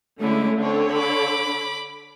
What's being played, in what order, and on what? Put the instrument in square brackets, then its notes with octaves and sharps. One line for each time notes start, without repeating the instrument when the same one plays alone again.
[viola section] D3 G#3 [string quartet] A3 C#4 E4
[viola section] D3 D4 C#5 [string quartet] C4
[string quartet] B5 D6